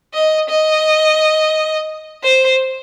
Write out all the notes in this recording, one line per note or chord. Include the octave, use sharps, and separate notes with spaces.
D#5
D#5
C5